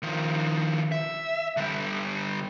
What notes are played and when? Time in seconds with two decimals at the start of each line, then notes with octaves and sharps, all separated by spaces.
0.03 D#3 F3
0.92 E5
1.57 D3 G3